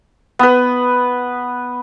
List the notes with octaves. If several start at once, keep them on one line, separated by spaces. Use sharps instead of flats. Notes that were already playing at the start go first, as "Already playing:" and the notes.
B3 B4